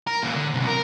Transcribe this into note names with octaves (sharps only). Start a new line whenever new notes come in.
A#4
A#2 E3
D3
B1 C3
A#4